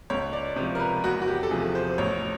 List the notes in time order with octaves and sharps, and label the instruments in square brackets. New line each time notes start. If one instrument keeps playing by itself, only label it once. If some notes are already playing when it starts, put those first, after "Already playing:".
[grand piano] C#2 C#5
D5
C3 C5
F3
A#4
B4
E2 F#4
F#4
G4
A4
C3 F3 G#4
C5
A1 C#5